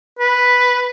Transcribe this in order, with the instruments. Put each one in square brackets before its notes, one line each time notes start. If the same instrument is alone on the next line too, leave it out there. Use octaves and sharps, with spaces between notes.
[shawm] B4